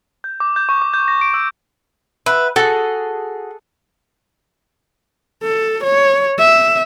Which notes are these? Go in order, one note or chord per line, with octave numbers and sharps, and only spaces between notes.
G6
D6
G6
C#6
D6
G6
A#6
D7
E6
B4 E5 F#5
F#4 G#4 A4
A4
C#5
E5